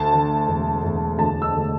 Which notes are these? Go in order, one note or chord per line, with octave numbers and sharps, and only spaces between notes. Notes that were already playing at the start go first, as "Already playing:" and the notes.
Already playing: D2 A5
D3
E1
E1
D2 A5
E6
D3